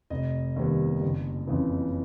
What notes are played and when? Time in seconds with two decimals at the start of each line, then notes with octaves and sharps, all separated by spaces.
0.10 F1 D#5
0.56 D#2 D#3 G3 B3
1.01 F#1
1.47 F2 C#3 E3